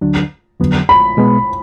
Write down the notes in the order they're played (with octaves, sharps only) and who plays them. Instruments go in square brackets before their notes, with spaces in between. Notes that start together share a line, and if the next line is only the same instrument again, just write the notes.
[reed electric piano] D2 D3 F#3 D4
F2 D3 F#3 B3
[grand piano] B5
[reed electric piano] B2 G#3 B3